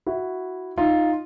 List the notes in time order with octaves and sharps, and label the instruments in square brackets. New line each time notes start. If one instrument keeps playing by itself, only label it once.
[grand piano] E4 F#4
D#4 F4